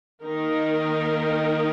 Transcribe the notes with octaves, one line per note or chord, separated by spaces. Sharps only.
D#3 A#3 D#4 A#4